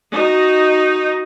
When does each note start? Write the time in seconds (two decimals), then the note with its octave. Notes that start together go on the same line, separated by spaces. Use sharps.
0.14 D#4 F#4